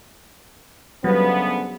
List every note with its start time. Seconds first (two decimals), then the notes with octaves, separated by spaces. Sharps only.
1.04 D2 C#3 F#3 G3 B3